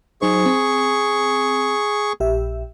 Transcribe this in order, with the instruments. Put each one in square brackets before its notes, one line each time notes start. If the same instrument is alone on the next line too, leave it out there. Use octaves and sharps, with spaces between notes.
[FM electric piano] F#3 D#4 C5 [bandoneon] G#4 C#6
[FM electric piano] C4
A#1 G4 E5